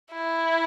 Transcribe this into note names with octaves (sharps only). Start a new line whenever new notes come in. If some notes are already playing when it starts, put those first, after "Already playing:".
E4